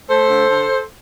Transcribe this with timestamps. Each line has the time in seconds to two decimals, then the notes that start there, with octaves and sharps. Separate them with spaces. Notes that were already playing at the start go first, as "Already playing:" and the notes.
0.09 A3 A4 C5
0.29 D3
0.50 D3